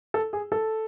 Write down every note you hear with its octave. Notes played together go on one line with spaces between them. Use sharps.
A4
G#4
A4